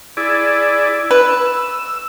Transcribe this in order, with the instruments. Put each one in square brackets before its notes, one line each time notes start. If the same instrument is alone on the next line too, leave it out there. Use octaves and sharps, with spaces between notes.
[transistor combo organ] E4 G#4 D5
[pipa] B4 [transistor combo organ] E6